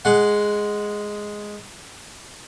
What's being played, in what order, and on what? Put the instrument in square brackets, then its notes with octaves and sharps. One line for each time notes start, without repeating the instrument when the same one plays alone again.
[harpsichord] G#3 F#5